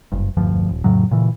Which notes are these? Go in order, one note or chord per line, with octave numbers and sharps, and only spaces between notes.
F#1 G2
E1 D2 G2 F3
D#1
F2 A2 C#3 F#3
A#2 C#3 E3